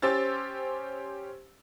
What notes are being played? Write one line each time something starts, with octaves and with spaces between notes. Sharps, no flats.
C#4 G4 C5 E6 A6